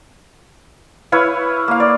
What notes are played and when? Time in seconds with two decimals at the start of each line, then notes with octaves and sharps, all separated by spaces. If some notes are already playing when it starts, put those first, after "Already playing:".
1.12 E4 B4 C#5 F5
1.68 A#3 F5
1.80 D5